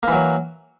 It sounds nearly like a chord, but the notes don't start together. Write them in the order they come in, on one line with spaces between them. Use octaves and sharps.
A#3 E3 F#3